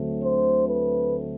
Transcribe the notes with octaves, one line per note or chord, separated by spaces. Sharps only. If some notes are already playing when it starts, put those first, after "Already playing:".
Already playing: D2 D3 F#3 A3 C4
C5
B4